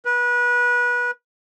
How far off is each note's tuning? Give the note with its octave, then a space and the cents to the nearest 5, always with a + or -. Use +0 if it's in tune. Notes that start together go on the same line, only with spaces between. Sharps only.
B4 -25